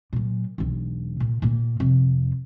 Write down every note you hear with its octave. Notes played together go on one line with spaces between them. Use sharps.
A#2 F#3
E1 B1
A#2
A#2 A#3
F2 C3